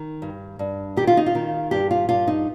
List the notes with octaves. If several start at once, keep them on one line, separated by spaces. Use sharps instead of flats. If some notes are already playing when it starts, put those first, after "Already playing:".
Already playing: D#3
G2
G2
D#3 G4
F4
D#4
F4
D#3
G2 G4
F4
G2 F4
D#4